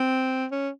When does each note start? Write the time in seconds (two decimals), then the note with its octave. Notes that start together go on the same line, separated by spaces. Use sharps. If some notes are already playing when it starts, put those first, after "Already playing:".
Already playing: C4
0.51 C#4